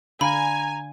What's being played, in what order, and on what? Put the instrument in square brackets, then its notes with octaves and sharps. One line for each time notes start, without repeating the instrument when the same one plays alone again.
[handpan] D3 D4 F5 [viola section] G#5 [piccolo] A#5 [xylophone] B5